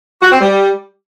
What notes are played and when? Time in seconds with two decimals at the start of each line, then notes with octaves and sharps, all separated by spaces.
0.22 F#4
0.32 C4
0.41 G3